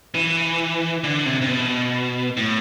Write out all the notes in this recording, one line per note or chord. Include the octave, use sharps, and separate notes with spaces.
E3
D3
C3
C3
B2
A2